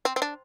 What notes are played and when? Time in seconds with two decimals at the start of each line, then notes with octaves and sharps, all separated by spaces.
0.05 C4
0.16 C4
0.22 D4